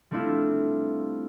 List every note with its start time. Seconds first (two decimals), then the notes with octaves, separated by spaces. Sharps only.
0.11 G3 A3 C4 D4 E4 F4